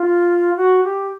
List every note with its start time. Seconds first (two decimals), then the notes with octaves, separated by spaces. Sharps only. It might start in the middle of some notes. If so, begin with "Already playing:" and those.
Already playing: F4
0.57 F#4
0.84 G4